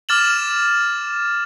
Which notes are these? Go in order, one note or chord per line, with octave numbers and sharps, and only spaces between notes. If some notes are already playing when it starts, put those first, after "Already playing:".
D6 F6 A6 E7 F#7